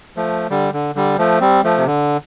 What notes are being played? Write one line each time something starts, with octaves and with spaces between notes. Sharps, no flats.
F3 A3
D3 G3
D3
D3 G3
F3 A3
G3 C4
F3 A3
C3
D3